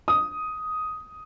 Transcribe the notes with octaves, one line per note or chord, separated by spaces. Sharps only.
D#6